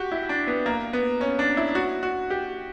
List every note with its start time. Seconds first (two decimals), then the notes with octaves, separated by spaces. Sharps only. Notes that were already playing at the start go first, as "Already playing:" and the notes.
Already playing: F#4 G4
0.12 E4
0.29 D4
0.47 B3
0.66 A#3
0.93 B3
1.21 C#4
1.39 D4
1.57 E4
1.75 F#4
2.03 F#4
2.30 G4